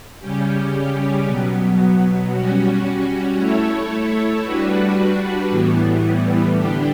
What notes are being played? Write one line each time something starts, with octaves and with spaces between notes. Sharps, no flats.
C#3 G3 C#4 G4
B2 F#3 B3
G3 C#4 F#4
A3 E4 A4 C#5
G3 D4 F#4 B4
A2 E3 G3 B3
D3 G3 D4 G4